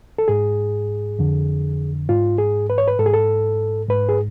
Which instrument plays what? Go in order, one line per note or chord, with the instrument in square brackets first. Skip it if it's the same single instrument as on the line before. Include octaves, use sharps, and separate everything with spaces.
[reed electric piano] A4
G#2 G#4
F2 D3
G#2 F4
G#4
B4
C#5
B4
G#2 A4
G#4
A4
G#2 B4
G#4